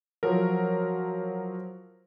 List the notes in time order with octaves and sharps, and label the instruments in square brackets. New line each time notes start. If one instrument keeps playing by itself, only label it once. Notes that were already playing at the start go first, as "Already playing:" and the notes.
[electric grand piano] F3 F#3 A#4